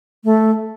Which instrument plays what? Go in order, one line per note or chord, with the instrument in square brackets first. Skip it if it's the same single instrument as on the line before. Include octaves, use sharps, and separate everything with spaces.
[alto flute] A3